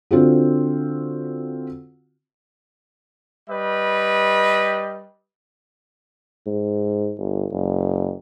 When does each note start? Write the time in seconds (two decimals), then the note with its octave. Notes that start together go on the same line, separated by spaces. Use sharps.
0.11 D3 C4 F4 F#4
3.50 G3 B4 D#5
6.46 G#2
7.18 G1
7.52 F#1